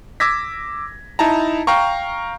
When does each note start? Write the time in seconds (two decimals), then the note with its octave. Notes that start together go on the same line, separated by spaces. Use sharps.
0.20 D6 E6 G#6 A#6 B6
1.19 D#4 E4 A5 A#5
1.67 F5 G5 A#5 C#6